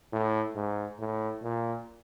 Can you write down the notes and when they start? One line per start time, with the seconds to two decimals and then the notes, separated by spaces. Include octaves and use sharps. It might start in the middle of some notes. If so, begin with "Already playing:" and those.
0.12 A2
0.55 G#2
0.99 A2
1.43 A#2